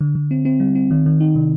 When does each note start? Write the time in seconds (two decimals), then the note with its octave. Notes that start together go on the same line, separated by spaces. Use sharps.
0.01 D3
0.15 D3
0.31 C4
0.45 C4
0.60 G3
0.75 C4
0.91 D#3
1.06 D#3
1.20 D#4
1.36 C3